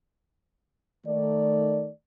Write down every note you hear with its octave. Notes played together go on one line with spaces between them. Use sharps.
D#3 A3 D5